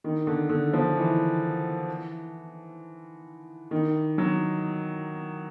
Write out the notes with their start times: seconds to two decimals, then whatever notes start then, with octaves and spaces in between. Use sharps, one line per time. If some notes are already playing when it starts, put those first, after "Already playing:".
0.04 D#3
0.27 D3
0.49 D3
0.73 F3
0.96 E3
3.71 D#3
4.18 F#3